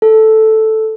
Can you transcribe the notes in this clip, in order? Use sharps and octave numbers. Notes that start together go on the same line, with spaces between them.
A4